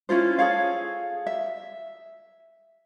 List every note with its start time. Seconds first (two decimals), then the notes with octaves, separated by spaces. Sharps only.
0.09 C#4 E4 F4 C5
0.38 G#4 A4 C#5 F5
1.27 E5